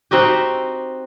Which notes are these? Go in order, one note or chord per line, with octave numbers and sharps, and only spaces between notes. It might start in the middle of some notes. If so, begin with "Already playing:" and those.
C4 D#4 F#4 G4